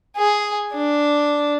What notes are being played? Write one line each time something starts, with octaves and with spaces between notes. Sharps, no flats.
G#4
D4